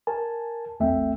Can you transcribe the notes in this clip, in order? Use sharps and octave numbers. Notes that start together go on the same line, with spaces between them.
A#4 G#5 A5
A#1 E2 A3 C4 E5 G5